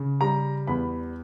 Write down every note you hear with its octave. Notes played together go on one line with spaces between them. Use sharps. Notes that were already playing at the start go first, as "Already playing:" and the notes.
Already playing: C#3
G3 A#5
E2 B5